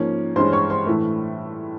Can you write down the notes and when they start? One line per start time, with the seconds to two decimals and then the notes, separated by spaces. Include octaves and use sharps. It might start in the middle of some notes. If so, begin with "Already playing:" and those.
Already playing: G#2 F3 A#3 C#4
0.36 G2 E3 G#3 C#4 C5 C6
0.52 C#5 C#6
0.70 C5 C6
0.86 A2 E3 A3